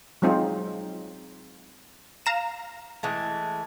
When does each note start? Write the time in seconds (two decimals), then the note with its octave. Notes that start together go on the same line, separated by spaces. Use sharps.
0.22 F#3 G#3 C4 D#4 F4
2.26 F5 A#5 E7
3.03 E3 G#3 A3